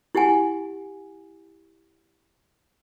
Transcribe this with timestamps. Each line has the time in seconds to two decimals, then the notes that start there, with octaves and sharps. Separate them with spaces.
0.15 E4 G4 F#5 G#5